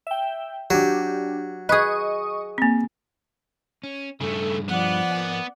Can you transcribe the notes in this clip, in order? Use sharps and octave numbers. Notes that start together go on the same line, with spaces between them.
E5 G5
F#3 D4 G4
G#4 B4 D#5 C#6 D#6
A#3 C4
C#4
G2 C#3 A3 G#4 A4
F3 B3 D5 F#5
A#4 G#5